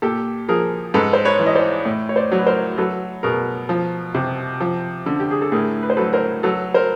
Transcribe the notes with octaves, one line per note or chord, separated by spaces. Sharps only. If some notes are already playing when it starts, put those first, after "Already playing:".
A#2 G4 A4
F3 G#4 A#4
G#2 A4 B4
C5
B4 C#5
E3
D#5
C5 D5
A2
C#5
C5 D5
F#3
B4
A#4 C5
F#3 A4 B4
B2 G#4 A#4
F3
C3
F3
D3
G4
G#4
A4
A2 G#4 A#4
B4
C5
F#3 A4 B4
A#4 C5
F#3 A4 B4
A#4 C5